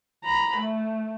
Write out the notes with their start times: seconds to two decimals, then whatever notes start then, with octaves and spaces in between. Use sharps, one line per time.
0.24 A#5 B5
0.57 A3